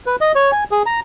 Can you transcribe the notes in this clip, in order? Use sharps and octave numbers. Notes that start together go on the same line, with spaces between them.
B4
D#5
C#5
G#5
G#4
A#5